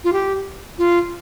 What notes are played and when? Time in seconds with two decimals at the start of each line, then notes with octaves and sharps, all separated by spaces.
0.04 F4
0.13 G4
0.79 F4